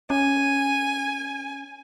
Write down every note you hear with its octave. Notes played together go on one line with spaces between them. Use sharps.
C#4 G#5